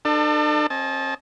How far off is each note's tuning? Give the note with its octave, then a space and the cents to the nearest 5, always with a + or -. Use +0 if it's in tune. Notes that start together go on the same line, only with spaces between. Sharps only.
D4 +40 A4 +20
C4 +45 D#5 +0 A5 -25